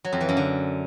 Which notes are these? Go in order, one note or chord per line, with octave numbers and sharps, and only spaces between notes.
F#3
F2
E3
F#2
D3